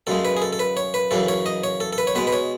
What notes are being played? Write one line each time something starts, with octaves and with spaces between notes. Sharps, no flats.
F#2 C#3 G#3 A4
B4
G#4
A4
A4
B4
C#5
B4
F#2 C#3 E3 A4
C#5
D#5
C#5
A4
A4
B4
C#5
B2 G#3 B4
B4
C#5